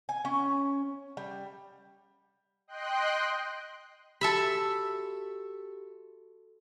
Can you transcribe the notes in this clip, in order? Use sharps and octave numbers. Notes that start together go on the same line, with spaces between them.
G#5
C#4
G3
D#5 G5 C6 F#6
F#4 G4 A4 E5 B5